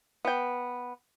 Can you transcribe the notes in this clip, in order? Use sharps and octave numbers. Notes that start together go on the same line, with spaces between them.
B3 G5